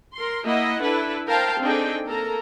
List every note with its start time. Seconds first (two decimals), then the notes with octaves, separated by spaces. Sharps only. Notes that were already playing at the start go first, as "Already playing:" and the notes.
0.14 A#4 C6
0.45 A#3 E4 D#5 E5 F#5
0.82 D4 E4 A4 B4
1.28 A#4 C5 F5 G5 A5
1.61 C4 D4 D#4 G#4 A4 G5
2.06 A#3 A4 A#4 A#5